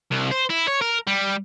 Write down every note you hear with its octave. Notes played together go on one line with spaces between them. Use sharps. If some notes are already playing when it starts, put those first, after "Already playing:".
C2
C5
E4
C#5
A#4
G3